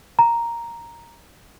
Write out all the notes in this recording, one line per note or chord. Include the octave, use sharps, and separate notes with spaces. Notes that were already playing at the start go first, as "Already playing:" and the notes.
A#5